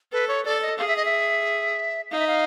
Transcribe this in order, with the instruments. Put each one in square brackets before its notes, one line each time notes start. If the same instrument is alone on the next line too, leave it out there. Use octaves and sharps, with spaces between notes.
[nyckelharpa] A4 [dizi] B4
[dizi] C#5
[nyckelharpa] A4 [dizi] D5
[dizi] D#5
[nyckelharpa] G#4 [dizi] F5
[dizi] E5
D#5
E5
[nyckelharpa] D#4 [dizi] F5
[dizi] E5
F5